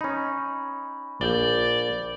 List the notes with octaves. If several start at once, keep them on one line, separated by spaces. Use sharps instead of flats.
C#4 D#4 B5
A#1 D5 G6 G7